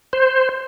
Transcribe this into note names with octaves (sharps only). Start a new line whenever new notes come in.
C5